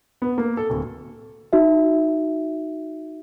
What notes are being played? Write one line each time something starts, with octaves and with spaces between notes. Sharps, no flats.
B3
A#3
A4
D1
D#4 F#4 E5